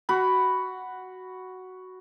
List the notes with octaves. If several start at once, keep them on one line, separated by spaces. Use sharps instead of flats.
F#4 F#5 B5